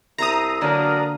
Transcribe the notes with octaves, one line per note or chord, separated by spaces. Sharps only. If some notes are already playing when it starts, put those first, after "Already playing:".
C2 C5 E5 A5 A#5 D#6
D3 F#3 A#3 D4 A#4